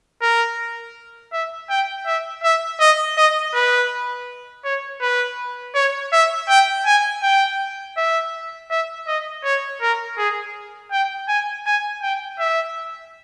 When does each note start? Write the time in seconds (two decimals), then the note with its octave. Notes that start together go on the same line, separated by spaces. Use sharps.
0.22 A#4
1.33 E5
1.70 G5
2.06 E5
2.44 E5
2.80 D#5
3.17 D#5
3.54 B4
4.64 C#5
5.02 B4
5.75 C#5
6.12 E5
6.49 G5
6.86 G#5
7.23 G5
7.97 E5
8.70 E5
9.07 D#5
9.44 C#5
9.82 A#4
10.18 G#4
10.92 G5
11.28 G#5
11.66 G#5
12.02 G5
12.39 E5